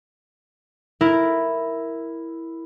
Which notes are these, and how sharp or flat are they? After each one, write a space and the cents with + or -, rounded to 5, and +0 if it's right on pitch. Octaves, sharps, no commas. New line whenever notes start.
E4 +0 A#4 +0